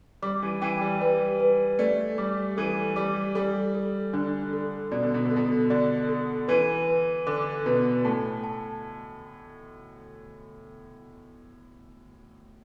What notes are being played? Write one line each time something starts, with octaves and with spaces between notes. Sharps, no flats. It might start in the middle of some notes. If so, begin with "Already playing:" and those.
G3 D6
E3
E3 G5
G3
G3 B4
B4
A3 D5
G3 D6
E3 A4
G3 D6
G3 A4
A4
D3 D4
A4
B2 D5
D3
B2
D3
A4
B2
D3 D5
A4
E3 B4
B4
D3 D6
B2 B4
A2 A5
A5